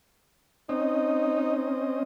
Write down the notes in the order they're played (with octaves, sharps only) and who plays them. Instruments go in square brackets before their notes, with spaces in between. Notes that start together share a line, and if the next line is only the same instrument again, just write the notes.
[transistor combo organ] C4 C#4 D#5 [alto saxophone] D#4